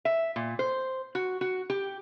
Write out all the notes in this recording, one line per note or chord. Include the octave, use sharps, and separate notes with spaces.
E5
A#2
C5
F#4
F#4
G4